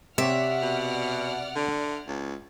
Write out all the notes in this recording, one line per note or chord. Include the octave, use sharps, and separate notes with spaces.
C3 G4 C#5 D5 E5 F#5 F6
B2
D3
C#2